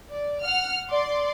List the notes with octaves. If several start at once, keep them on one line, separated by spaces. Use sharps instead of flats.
D5
F#5 F6
D5 C6 D6